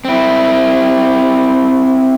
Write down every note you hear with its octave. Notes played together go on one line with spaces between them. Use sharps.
C4 E4